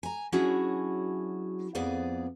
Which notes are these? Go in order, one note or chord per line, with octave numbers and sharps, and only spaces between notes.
G#5 A#5
F#3 C#4 D4 E4 F#4 G#4
F2 F3 B3 G#4 D5